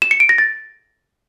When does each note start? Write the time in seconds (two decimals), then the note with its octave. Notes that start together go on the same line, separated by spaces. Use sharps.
0.02 E7
0.11 C#7
0.20 D7
0.29 A#6
0.38 A6